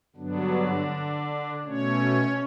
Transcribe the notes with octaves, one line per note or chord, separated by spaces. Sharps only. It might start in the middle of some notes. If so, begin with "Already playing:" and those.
G2 D3 F#3 B3 D4
B2 A3 C#4 C#5